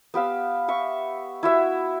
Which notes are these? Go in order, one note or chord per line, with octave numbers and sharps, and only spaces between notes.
B3 G4 F5 E6
E5 C#6
E4 F#4 E5